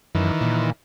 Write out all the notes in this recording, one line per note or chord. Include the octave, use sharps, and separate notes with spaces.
F#2 D#3 E3
A#2